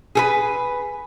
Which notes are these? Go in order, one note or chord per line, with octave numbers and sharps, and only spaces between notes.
G#4 A4 B4